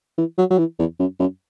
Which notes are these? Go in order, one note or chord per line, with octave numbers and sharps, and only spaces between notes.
E3
F#3
F#3
E3
E2
F#2
F#2